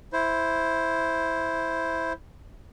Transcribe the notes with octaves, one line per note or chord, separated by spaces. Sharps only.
E4 C5